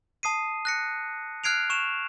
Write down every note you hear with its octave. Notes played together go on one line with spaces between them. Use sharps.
A5 D#6 C7 D#7
F#6 A#6 C#7
F6 F#6 G#6 C7 D7 F7
C#6 E7 F7